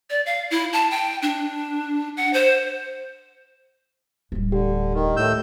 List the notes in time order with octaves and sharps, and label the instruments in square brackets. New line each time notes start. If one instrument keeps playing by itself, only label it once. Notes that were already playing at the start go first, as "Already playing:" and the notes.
[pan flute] D5
F5
E4
A5
G5
D4
F#5
C5
[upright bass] D1 G3
[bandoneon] D3 [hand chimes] G4
[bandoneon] D#3
A2 E6 G6